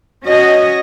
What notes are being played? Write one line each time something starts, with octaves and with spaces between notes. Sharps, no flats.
C#4 F#4 D#5